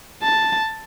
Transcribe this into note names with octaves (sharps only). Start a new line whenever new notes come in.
A5